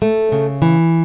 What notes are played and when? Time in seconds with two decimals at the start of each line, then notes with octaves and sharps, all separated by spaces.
0.02 A3
0.32 C#3
0.62 E3